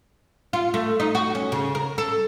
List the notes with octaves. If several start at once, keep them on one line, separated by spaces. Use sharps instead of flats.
F4
A3
D#4
F#4
C#4
C#3
A#4
A4